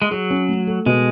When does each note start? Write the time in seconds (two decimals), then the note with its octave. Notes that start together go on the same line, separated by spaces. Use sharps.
0.02 G#3
0.11 F#3 G#4
0.30 C#4
0.49 A3
0.67 A4
0.86 B2 G#3